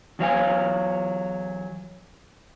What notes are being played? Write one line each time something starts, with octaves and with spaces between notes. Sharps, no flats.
E2 F#3 F5 G#5